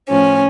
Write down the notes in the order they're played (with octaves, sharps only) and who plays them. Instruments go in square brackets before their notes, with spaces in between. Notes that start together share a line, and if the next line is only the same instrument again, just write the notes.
[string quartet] A2 F3 C#4